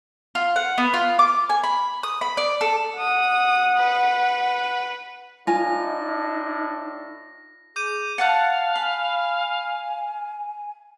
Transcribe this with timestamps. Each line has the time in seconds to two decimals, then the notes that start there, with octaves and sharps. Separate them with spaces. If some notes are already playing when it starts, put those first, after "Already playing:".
0.35 F4
0.56 F#5
0.78 B3
0.94 F4
1.19 D6
1.49 G#5
1.64 B5
2.03 D#6
2.21 B5
2.37 D5
2.61 A4
2.99 F#5 D#6
3.77 B4
5.47 A2 D4 D#4 F4 G#5 A#6
7.76 G#4 D6 G6 D#7
8.18 F5 F#5 A5 F#6
8.76 G#5 B5